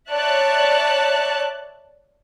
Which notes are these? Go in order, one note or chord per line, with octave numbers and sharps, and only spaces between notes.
C#5 D5 E5 A5 F#6